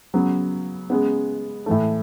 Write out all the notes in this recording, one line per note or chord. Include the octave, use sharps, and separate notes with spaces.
C#3 F#3 B3
C#3 G#3 B3
A2 E3 A3